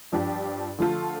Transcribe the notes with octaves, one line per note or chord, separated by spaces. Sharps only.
G2 F3 D4 G4
D3 F3 A3 F4 A4